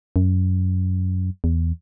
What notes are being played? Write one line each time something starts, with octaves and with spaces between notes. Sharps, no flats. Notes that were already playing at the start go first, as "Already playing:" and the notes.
F#2
E2